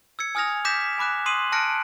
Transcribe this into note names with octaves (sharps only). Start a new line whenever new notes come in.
E6 G#6 C#7
G#5 D#6 F6 G#6 A#6 F7
D6 F6 G6 A#6 B6 E7
G#5 B5 D6 F#6 E7
C6 D#6 C7 D#7 F#7
A5 F6 F#6 A#6 C#7 D7